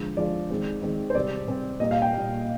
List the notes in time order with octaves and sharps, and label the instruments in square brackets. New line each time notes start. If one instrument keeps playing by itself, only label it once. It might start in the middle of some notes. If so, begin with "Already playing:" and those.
Already playing: [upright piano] D3 F3 G#3
D3 F3 G#3 D5
D#3 G#3 C4
D#3 G#3 C4
C5
C3 G3 C4 D5
C3 G3 C4
A#2 G3 A#3 D#5
F5
G5
A#2 G3 A#3